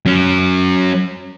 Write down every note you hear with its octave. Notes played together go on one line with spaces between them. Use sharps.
F#3 C#4